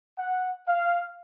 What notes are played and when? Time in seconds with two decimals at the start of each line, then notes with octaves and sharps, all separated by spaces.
0.18 F#5
0.68 F5